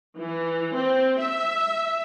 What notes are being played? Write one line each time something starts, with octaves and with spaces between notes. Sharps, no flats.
E3
C4
E5